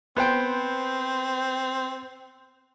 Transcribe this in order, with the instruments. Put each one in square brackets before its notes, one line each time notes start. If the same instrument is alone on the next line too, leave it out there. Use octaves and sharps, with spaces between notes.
[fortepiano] B3 C5 G5 [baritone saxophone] C4